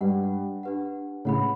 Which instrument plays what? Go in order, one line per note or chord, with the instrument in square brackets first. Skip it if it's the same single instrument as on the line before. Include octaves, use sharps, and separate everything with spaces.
[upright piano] G2 [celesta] D4 G4 B4 F#5
[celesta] D4 G4 B4 F#5
[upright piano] A2 C#3 [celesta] C#5 F#5 B5